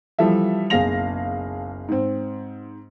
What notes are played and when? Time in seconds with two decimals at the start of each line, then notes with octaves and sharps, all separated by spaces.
0.19 E3 F3 G3 A4 E5
0.70 F#1 B1 G#4 F5 A#6 F7
1.89 G#2 C4